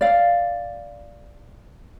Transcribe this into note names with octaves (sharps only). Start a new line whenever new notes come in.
D5 F5